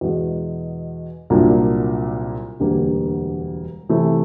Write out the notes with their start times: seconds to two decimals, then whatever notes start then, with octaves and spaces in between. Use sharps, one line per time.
0.01 E2 B2 G#3
1.30 C2 A#2 F#3 A#3 D4
2.60 E1 D2 D3 G3 A#3
3.89 C3 E3 A3